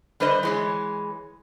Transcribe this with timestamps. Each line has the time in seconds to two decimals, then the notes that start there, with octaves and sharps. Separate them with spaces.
0.20 D3 G3 B4 C5 D#5
0.43 E3 G#3 C#5